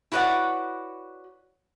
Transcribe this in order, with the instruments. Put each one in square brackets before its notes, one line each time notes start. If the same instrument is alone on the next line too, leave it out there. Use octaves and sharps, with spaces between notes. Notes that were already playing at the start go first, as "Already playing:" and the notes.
[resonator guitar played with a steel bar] E4 F#4 B4 C#5 D5 F#5